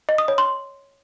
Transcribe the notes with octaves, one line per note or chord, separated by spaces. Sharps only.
D#5
D#6
C#5
C6